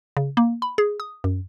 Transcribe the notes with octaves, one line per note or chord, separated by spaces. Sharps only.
C#3
A#3
B5
G#4
D#6
F#2